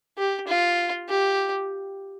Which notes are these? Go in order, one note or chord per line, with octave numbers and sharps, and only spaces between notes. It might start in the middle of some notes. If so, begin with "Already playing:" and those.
G4
F4
G4